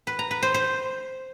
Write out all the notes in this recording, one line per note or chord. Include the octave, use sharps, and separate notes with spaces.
B4
A#5
B4
C5
C5